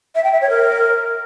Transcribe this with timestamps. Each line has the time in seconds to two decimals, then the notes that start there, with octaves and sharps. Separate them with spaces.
0.15 E5
0.24 G5
0.33 E5
0.41 C#5
0.50 A#4